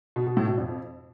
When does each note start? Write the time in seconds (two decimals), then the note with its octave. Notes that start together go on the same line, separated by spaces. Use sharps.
0.16 B2
0.26 B2
0.37 A2
0.47 B2
0.58 F2